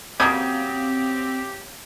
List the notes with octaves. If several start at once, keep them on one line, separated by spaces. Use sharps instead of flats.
C#3 F#3 A#3 C4 G4 D#6 G6 G#6